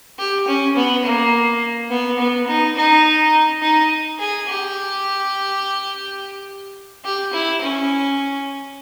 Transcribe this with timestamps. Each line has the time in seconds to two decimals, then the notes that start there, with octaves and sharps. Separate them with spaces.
0.19 G4
0.48 C#4
0.76 B3
1.05 A#3
1.90 B3
2.18 B3
2.48 D#4
2.76 D#4
3.62 D#4
4.19 G#4
4.48 G4
7.05 G4
7.33 E4
7.61 C#4